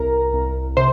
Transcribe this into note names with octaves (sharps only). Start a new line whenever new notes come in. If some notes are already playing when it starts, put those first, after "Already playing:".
Already playing: C2 A#4 A#5
C2
C3 C5 C6